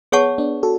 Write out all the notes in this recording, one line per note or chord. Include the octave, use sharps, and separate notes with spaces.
B3 G#4 C#5 F#5 A5 C#6
B3 D4
F#4 A4